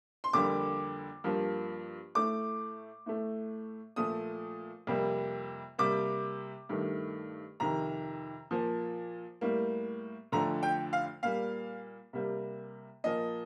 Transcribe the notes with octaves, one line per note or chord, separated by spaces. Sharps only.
C6
F2 D3 G3 A#3 D6
G2 F3 A#3
A2 A3 D6
A2 A3
A#2 F3 A3 D#6
F2 C3 G3 A#3
C3 G3 A#3 D6
G2 D#3 A3
F2 C3 D#3 A#5
A#2 F3 A#3
A2 G3 A#3
F2 D3 F3 A3 A#5
G5
F5
A#2 G3 A#3 F5
C3 G3 A#3
A#2 F3 A#3 D#5